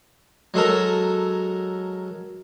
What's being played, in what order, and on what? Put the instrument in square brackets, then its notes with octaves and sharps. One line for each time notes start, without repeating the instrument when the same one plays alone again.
[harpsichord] F#3 G#3 A4 A#4